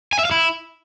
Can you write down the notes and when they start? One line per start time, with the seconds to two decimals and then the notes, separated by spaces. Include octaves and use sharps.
0.13 G#5
0.19 E5
0.25 F5
0.31 E4